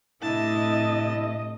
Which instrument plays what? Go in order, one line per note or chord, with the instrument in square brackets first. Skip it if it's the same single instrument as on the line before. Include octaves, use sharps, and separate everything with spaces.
[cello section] A2 C3 D#5 [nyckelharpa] D4 A5 [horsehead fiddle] E4